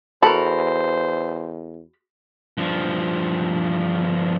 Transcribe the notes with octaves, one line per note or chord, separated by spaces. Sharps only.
E2 F#4 A4 A#4 C5 B5
G2 F3